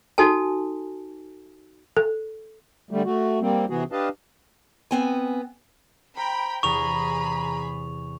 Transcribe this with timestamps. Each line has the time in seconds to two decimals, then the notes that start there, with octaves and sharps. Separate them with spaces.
0.18 D#4 F#4 A4 G#5 A5
1.97 A4
2.91 D3 G3 A3
3.05 A3 F#4
3.41 G3 A#3 C4
3.70 C3 E3 B3 F#4 G#4
3.92 D4 G4 B4 D#5 F5 A5
4.91 B3 C4 G#5
6.17 C5 G5 A#5 B5
6.63 E2 C3 G#4 A#5 B5 C#6 F7